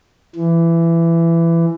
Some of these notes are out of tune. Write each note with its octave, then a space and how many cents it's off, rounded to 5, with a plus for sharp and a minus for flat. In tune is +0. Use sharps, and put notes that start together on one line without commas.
E3 +20